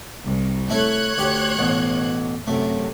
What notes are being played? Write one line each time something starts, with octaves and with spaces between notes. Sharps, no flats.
C2
A3 E4 A4 C#5 F#6 G#6
D2 G4 C6
A1 B2
F#2 C3 A3